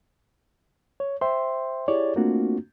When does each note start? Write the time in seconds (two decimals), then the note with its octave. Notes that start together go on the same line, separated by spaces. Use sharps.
1.00 C#5
1.21 C5 E5 G5 C6
1.88 E4 G4 G#4 C#5 D5
2.16 A3 A#3 C4 D4 F4 F#4